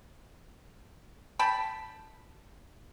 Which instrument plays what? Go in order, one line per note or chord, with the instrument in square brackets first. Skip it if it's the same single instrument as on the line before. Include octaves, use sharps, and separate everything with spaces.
[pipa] G5 A5 B5